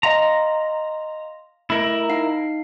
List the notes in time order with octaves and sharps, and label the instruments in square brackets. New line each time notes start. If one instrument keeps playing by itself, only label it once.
[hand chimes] D#5 F5 C6 [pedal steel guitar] A#5
[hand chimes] A3 [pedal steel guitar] E4 A#4
[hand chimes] D#4 F5 C7